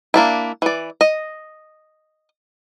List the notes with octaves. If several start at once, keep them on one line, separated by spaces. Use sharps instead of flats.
A#3 D4 E4
E3 D5
D#5